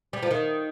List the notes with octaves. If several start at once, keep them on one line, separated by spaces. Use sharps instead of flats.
G3
F3
D#3